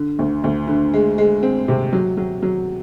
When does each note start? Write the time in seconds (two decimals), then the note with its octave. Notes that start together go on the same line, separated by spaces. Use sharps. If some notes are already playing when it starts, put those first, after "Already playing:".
Already playing: D3
0.19 D2
0.44 D2
0.68 D3
0.94 G#3
1.18 G#3
1.43 C4
1.68 C3
1.93 F#3
2.17 F#3
2.42 F#3